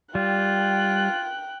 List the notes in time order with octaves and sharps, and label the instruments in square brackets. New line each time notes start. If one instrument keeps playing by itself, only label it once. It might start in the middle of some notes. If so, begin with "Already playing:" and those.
[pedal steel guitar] G3 [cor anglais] F4 [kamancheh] G5 F#6